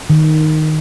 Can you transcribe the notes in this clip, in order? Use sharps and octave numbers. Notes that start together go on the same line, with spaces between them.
D#3